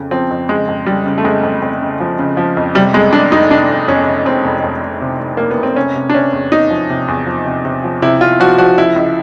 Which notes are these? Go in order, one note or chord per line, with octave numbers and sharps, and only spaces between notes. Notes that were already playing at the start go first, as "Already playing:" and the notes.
Already playing: F2 C#3
F3 C4
F2
C#3 G#3
F2
C#3 G3
C#3
A3
F2 G#3
F2
F2
C#3
F3
C#3
F3
F2
C3 G3
F1 G#3
F2 D4
F1 D#4
F1 D4
F2
F2 C#4
C3
F2 C4
F1
F2
F1
C3
F1
F1 A#3
B3
F1
C4
C3 C#4
C3
D4
C3 C#4
E2
E2 D#4
F3
C3
E2
F3
C3
C3
F3
C3 E4
C3 F4
F3 F#4
F3 F#4
C#2 E4
C#2